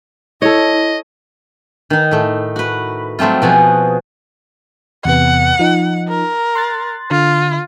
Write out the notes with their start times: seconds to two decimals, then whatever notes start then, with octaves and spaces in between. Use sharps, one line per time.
0.42 E4 A4 C#5 D#5
1.90 D#3 D#4
2.11 A2 A3
2.56 F#4 B4
3.19 F#3 G3 A3 C4 F4
3.42 B2 F3 F#4 G#4
5.05 E2 C3 B3 F#5
5.59 F3 D#4
6.09 A#4
6.55 C6 F#6 A6
7.11 D3 F4